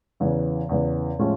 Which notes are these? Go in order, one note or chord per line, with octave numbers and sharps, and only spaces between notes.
E2 C#3 E3
E2 C#3 E3
A2 F3 G#3 C#4